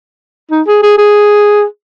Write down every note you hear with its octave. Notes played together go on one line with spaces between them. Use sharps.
D#4
G#4
G#4
G#4